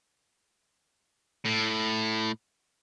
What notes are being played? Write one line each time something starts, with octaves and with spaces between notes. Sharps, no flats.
A2